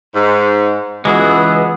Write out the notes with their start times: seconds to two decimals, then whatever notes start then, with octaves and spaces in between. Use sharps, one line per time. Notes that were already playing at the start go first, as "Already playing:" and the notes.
0.14 G#2
1.05 C#2 E3 G#3 B3 F#4 G#4